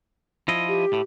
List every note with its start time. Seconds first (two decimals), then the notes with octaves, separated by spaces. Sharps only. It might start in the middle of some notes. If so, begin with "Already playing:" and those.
0.48 F3 E4 D#5
0.68 G4
0.93 A2